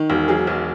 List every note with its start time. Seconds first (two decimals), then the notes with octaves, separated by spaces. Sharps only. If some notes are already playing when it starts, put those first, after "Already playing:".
Already playing: D#3
0.10 E1
0.28 F#3 G#4
0.47 B1